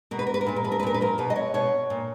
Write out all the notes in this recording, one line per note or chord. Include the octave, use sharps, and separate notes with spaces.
B2 A#4
B4
A#4
B4
A#4
A#2 B4
A#4
F3 B4
A#4
B4
A#2 A#4
B4
F3 A#4
B2 B4
D#5
C#5
B2 C#5
A#2